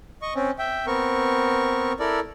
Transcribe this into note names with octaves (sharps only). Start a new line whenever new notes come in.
D#5 C#6
C4 C#4
E5 G5
B3 C4 A#4 C#6
E4 A4 A#4 D5